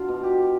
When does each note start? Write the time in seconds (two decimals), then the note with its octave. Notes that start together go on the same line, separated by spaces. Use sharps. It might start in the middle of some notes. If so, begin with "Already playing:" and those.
Already playing: F#3 D4 F4
0.08 B2
0.23 G4